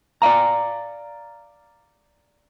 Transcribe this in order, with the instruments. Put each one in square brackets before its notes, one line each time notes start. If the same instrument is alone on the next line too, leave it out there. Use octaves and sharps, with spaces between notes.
[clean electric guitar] D5 E5 F5 A#5